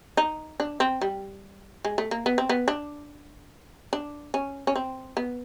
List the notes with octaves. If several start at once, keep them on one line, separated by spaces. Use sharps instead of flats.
D#4
D4
C4
G3
G#3
A3
A#3
B3
C4
B3
D4
D4
C#4
C#4
C4
B3